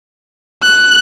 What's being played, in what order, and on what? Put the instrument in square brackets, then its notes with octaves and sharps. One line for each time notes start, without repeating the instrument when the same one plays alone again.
[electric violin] F#6